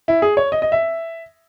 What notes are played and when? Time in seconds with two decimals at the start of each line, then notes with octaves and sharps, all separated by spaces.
0.08 E4
0.22 G#4
0.37 C#5
0.52 D#5
0.62 D#5
0.72 E5